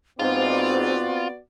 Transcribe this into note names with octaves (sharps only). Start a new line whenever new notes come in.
G#2 B3 C4 F4 F#4 D5